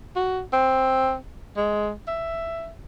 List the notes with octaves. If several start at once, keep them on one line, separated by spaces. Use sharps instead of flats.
F#4
C4
G#3
E5